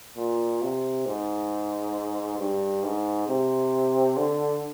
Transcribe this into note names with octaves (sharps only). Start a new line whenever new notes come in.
A#2
C3
G#2
G2
G#2
C3
D3